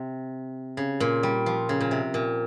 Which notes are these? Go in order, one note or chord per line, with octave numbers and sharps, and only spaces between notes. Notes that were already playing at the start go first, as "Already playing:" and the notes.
Already playing: C3
C#3
A#2
G3
F3
C#3
A#2
C3
A#2